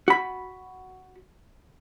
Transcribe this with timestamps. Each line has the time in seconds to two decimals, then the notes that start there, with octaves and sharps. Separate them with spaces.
0.08 F#4 B5